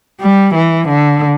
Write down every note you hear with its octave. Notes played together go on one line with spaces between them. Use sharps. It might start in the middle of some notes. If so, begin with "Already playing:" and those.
G3
E3
D3